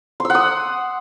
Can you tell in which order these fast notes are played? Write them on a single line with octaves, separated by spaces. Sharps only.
C6 E6 F#5 D#6